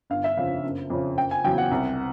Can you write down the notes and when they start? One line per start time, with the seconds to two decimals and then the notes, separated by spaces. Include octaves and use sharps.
0.10 G1 F5
0.24 E5
0.37 F2 C#3 F5
0.64 F#1
0.90 F2 C#3
1.17 F#1 G5
1.31 G#5
1.44 E2 C#3 F#3 G5
1.58 F#5
1.71 C2